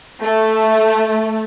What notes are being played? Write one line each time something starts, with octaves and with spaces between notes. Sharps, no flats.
A3